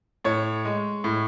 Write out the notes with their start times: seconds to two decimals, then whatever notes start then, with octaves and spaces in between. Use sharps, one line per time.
0.25 A2 C#5
0.65 G#3
1.04 A2